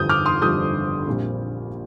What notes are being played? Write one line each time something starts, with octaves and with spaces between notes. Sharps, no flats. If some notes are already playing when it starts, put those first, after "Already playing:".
Already playing: G1 F2 D3 G3 D#6 G6
D6 F6
C6 D#6
G1 F2 D3 G3 D#6 G6
A#1 A#2 G3 C4